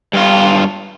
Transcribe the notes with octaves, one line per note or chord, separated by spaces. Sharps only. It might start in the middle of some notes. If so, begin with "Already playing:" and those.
G2 F4